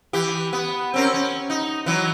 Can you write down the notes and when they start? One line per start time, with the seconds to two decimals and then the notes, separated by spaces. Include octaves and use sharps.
0.13 E3 G4
0.53 B3
0.94 C4 C#4 A#4
1.14 C#4
1.50 D#4
1.86 E3 F#3